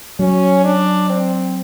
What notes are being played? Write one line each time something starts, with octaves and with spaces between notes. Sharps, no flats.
F#3 C#4
D4
C4